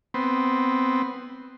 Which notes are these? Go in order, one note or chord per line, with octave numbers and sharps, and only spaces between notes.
B3 C4